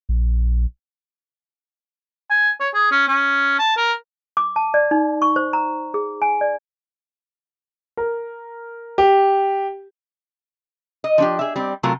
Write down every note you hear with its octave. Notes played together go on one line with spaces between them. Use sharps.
A#1
G#5
C#5
G#4
C#4
C#4
A5
A#4
D6
A5
D5
D#4
C#6
C5
A#5
G#4
G#5
D5
A#4
G4
D#5
F3 D4 G4
G#4 E5
G3 C4
C3 F#3 A3 F4 A#4